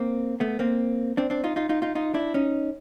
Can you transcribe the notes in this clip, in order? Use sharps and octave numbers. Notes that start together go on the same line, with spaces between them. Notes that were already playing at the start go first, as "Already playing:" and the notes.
Already playing: A#3 C4
A3 B3
A#3 C4
C4 D4
C4 D4
D#4 F4
D#4 F4
D#4 F4
D#4 F4
D#4 F4
D4 E4
C#4 D#4